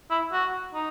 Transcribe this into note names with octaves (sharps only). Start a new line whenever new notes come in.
E4
F#4
D#4